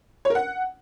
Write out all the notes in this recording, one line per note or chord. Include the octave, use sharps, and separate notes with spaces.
C#5
A#4
F#5